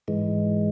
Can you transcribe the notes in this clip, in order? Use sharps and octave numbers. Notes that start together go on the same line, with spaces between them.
G#2 E3 G#3